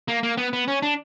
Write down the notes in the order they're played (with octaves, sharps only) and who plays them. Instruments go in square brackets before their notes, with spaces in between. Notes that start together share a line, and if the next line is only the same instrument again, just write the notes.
[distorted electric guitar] A#3
A#3
B3
B3
C#4
D4